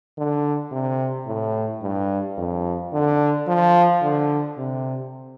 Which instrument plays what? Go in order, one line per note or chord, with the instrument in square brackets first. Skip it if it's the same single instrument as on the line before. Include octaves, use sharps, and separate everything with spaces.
[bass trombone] D3
C3
A2
G2
F2
D3
F3
D3
C3